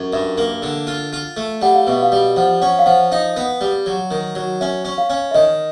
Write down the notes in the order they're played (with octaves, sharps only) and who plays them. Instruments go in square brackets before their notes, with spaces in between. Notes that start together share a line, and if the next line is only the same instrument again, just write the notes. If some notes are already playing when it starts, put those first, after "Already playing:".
Already playing: [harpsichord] F#2
[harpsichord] G2 [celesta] E5
[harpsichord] A#3
D3
F4
F4
A3
[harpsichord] G3 [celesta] F#5
[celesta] F5
[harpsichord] B2 [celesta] E5
[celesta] F5
[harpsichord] G3
[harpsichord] F3 [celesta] F#5
[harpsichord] C#4 [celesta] F#5
[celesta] F5
[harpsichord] F3 [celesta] F#5
[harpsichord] D#4 [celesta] F5
[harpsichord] B3
G3
F#3
D#3
F#3
[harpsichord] C#4 [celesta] E5
[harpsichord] C#4
[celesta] F5
[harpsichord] C#4
[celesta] E5
[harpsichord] D#3 [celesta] D#5